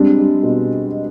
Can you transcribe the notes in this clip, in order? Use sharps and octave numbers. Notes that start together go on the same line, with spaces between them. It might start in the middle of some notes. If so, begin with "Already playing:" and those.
Already playing: G3 G#3 C4 D4
G3
B2